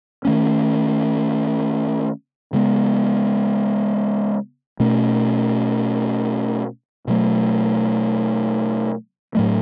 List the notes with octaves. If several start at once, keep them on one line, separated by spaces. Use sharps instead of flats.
D#3 A3 C#4
C#3 G#3 B3
B2 A3 C#4
B2 F#3 A3
A2 F#3 A3